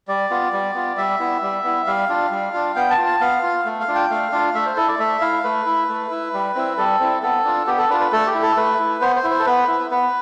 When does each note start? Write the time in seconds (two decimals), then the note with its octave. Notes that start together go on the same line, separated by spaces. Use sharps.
0.08 G3 D5
0.30 B3 F4
0.53 G3
0.74 B3 F4
0.97 G3 E5
1.20 B3 E4
1.42 G3
1.64 B3 E4
1.86 G3 F5
2.09 D4 F4
2.31 G3
2.53 D4 F4
2.76 B3 G5
2.90 A5
2.98 F4
3.06 A5
3.21 B3 F5
3.43 F4
3.65 A3
3.81 F5
3.88 D4 F4
3.95 G5
4.10 A3 F5
4.32 D4 F4
4.55 A3 E5
4.66 C5
4.77 E4 A4
4.88 D5
4.99 A3 E5
5.21 E4 F5
5.44 A3 B4
5.66 E4
5.89 A3
6.11 E4
6.33 G3
6.55 C4 E4
6.77 G3 A4
7.00 C4 E4
7.22 B3 A4
7.45 D4 F4
7.67 B3 G4
7.78 A4
7.90 D4 B4
7.93 F4
8.00 B4
8.12 A3 A4
8.26 G4
8.34 E4
8.42 A4
8.56 A3 B4
8.79 E4
9.01 B3 C5
9.16 C5
9.24 E4
9.30 C5
9.39 A4
9.46 B3 B4
9.68 E4
9.91 B3 B4